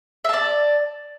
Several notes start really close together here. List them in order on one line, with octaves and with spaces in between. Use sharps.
E5 A5 D5